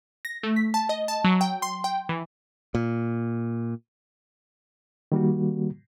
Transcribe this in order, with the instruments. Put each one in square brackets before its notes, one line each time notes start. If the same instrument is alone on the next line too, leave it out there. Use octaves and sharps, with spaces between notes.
[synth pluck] A#6
A3
B6
A5
D#5
A5
F#3
G5
C6
G5
E3
[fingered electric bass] A#2
[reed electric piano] D#3 G3 A#3 F#4